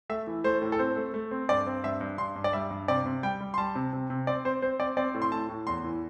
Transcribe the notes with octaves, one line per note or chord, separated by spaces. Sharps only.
A3 E5
E3
A3 C5
A2
A4
C4 C5
A3
A3
C4
G2 D5
C4
G2 E5
G2
G2 C6
G2
D5
G3 E5
G2
C3 D5
C3
G3 G5
G3
C6
G3 A5
C3
C3
C3
C4 D5
C4 C5
C4 C5
C4 D5
C4 D5
A2
C6
A2 A5
A2
E2 C6
E3